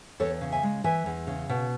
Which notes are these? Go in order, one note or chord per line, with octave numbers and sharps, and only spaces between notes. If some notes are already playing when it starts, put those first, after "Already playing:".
E2 A4 C#5
C#3
E5 G#5
G#3
E3 E5 G#5
E2
C#3
B2